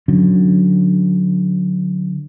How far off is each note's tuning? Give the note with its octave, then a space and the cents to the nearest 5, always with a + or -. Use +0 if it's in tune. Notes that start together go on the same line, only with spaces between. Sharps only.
D3 +5 F#3 -15 C#4 +0